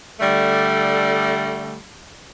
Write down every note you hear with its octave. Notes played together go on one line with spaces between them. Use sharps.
D3 G3 A3